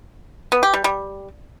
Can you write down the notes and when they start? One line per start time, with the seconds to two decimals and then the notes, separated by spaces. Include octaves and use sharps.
0.52 B3
0.63 G4
0.73 G3
0.84 G3